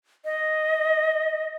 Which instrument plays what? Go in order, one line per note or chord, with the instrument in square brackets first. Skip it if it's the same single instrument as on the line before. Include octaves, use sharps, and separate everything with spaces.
[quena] D#5